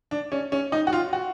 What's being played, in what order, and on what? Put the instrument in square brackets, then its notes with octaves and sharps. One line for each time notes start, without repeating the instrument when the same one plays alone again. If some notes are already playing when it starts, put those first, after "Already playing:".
[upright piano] D4
C#4
C#4
D#4
F#4
F4
F#4